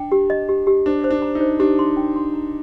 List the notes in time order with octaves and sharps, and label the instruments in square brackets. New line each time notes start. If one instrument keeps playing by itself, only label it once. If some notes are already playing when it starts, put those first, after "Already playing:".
Already playing: [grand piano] D4 [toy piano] G5
[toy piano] G4
D#5
G4
G4
[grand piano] D4 [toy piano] C5
[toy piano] C5
[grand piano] D4
[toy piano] A#5
[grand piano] D#4
[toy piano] C5
[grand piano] D4 [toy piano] G4
[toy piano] C6
G5
C6
A#5